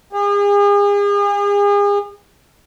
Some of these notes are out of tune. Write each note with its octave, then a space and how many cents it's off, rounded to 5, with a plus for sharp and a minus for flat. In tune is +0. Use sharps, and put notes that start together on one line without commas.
G#4 -40